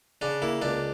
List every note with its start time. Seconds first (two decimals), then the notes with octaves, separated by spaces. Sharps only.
0.22 C#3 D4
0.42 A#3 E4
0.62 C#2 D4